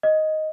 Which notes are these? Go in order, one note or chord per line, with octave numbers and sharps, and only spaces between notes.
D#5